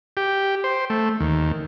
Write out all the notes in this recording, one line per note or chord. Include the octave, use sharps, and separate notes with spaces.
G4
C5
A3
D#2